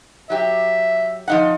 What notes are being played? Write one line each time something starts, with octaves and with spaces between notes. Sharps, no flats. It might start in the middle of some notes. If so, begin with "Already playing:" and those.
F#3 G4 E5
F3 D#4 F#5